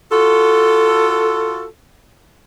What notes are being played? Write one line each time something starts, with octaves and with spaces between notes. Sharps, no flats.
F4 F#4 A4